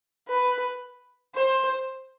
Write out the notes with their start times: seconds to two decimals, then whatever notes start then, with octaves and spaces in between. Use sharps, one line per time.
0.29 B4
1.35 C5